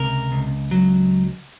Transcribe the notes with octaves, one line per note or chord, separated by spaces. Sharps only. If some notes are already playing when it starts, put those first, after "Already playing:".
Already playing: C#2 C3 A#4
C#2
F#3